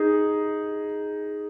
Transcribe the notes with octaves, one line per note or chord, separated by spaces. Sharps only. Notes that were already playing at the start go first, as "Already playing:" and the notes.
Already playing: D#4 G#4